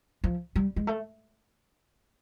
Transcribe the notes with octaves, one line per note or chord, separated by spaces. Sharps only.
F3
G3
G#3
A3